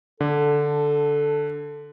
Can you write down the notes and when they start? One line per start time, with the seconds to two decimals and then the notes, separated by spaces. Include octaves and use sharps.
0.21 D3 A4